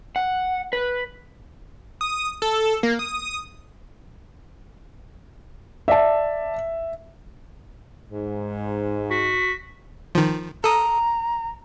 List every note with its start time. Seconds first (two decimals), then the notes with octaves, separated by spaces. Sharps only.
0.16 F#5
0.73 B4
2.01 D#6
2.42 A4
2.83 A#3
2.99 D#6
5.88 D5 E5 A5
8.11 G#2
9.10 F#4 B6
10.15 D#3 F3
10.64 A4 A#5 D#6